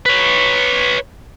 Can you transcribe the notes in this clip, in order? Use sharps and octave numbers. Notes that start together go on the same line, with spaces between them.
B4 C#5